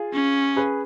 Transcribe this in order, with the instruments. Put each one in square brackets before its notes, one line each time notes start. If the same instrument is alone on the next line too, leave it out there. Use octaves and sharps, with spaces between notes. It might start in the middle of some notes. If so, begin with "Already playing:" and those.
Already playing: [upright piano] F4 G#4
[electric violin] C#4
[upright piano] G#4 B4